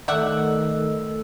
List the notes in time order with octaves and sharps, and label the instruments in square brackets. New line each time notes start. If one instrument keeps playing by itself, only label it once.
[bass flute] D#3 [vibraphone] A3 A4 E6 [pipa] D5 E5 F#5